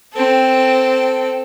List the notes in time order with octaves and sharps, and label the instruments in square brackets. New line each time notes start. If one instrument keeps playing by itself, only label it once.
[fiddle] C4 A4